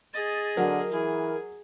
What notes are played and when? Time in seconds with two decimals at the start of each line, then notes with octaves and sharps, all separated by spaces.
0.14 G#4 D#5 A6
0.57 D3 F#3 A#4
0.92 E3 G#4